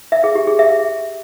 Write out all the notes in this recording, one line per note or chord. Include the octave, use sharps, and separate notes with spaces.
E5
G#4
G4
G#4
E5